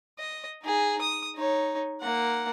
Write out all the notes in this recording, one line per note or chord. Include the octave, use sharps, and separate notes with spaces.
D#5
D#4 G#4
D#6
D#4 C#5
A#3 F#5